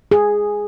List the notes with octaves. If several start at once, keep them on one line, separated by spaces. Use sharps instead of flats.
G#4